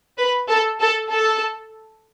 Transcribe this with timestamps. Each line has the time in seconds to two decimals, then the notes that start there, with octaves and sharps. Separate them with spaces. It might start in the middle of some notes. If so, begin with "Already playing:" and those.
0.18 B4
0.49 A4
0.80 A4
1.11 A4